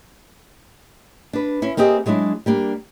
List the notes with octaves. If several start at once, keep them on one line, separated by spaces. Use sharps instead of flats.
D4 B4
C#4 E4
A#3 C4 G4 G#4 D#5
F#3 G#3 D4 E4
G3 A#3 D4